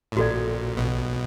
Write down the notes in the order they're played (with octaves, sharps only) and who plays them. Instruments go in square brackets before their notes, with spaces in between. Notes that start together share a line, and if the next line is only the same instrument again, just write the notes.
[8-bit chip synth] A2
[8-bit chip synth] A#1 A#2 [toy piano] F#4 A4 D5
[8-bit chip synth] B1 B2